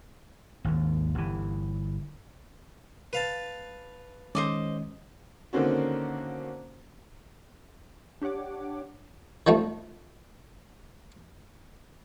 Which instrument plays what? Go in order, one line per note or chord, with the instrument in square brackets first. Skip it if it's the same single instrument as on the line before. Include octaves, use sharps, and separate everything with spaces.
[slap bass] G#1 D#2
G1 E3
[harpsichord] B4 F5 A5
[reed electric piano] D#3 G#3 C#4 [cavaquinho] C5 D#5 D6
[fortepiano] D3 D#3 A#3 C4 C#4 F#4
[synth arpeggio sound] D4 G4 C#5 F#5 D6
[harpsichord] D#3 F3 G3 A3